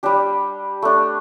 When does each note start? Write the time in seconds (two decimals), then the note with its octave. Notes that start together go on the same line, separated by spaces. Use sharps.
0.03 G3 D4 G4
0.82 A3 D4